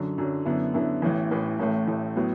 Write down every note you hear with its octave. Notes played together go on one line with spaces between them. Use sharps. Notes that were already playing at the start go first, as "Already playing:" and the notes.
Already playing: F#2 D3 F#3
F#2 D3 F#3
F#2 D3 B3 E4
F#2 D3 B3 E4
A1 A2 E3
A1 A2 E3
A1 A2 A3
A1 A2 A3
A2 F#3 B3